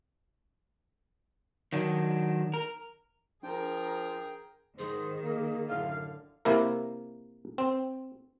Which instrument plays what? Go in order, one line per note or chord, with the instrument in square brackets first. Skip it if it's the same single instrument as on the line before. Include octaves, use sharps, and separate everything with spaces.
[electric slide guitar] D#3 F#3 D4
A#4
[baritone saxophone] F3 [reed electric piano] D4 [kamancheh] G#4 A#4 [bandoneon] G5
[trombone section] G#2 C5 [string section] D#3 [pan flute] G#4
[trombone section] A#3
[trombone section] F#2 A2 D3 [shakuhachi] F5
[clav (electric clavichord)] C3 A#3 E4 A#4
C4